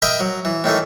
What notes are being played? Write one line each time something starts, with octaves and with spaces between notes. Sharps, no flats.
A#4 D#5 E5 G5 A#5 B5
F#3
E3
A2 D#3 E3 A3